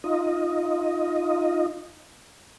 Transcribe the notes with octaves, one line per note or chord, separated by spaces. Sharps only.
D#4 F4 D#5